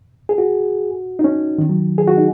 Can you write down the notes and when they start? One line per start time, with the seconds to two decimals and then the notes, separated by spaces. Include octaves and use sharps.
0.29 G#4
0.38 F#4
1.19 D#4
1.24 C#4
1.58 D#3
1.69 F#3
1.98 G#4
2.08 F#4
2.17 D#4